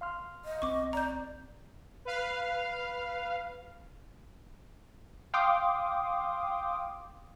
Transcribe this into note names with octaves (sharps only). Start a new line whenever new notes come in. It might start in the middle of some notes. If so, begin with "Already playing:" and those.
F5 C6 F6
D#5
B1 C4 C#6 D6
D5 A#5 G6
B4 F5
F5 G5 C6 D6 D#6